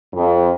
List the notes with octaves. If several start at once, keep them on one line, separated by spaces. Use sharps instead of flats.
F2